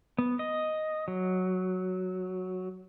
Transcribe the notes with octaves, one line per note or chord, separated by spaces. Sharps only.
B3
D#5
F#3